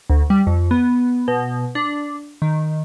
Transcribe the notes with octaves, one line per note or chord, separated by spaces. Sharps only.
D2
G3
F2
B3
B2
D4
D#3